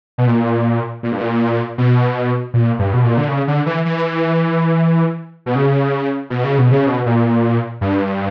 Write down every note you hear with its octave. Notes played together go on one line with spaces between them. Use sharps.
B2
A#2
A#2
G2
A#2
B2
A#2
G2
B2
A#2
D3
C#3
D3
E3
E3
B2
C#3
B2
C#3
B2
C#3
B2
A#2
G2